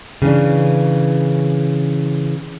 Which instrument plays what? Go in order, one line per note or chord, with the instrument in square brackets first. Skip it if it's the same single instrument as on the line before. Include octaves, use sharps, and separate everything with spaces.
[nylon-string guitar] C#3 E3 C#4 D4